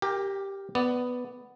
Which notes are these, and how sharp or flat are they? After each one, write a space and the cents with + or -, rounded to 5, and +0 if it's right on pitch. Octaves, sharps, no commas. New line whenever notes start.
G4 +0 A#4 +0 G5 +40
B3 +5 D5 +0